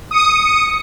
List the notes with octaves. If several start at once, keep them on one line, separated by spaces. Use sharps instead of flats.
D#6 C#7